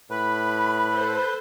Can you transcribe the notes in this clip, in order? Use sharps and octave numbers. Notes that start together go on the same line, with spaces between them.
A2 B4 B5
A4 C5 G6